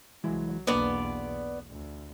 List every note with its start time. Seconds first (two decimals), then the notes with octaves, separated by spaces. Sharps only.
0.24 C2 E3 F#3 G#3 E4
0.67 B1 E2 A#3 B3 D4 D5 F#5
1.70 D2